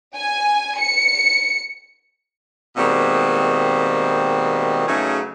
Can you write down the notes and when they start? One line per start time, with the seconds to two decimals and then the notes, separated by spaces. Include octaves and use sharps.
0.17 G#5
0.80 C#7
2.75 B2 D#3 G3 G#3 A#3 C4
4.86 C#3 F#3 A3 B3 D#4 G#4